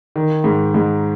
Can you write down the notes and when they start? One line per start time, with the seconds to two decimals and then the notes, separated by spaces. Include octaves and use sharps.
0.16 D#3
0.44 G#2
0.74 G#2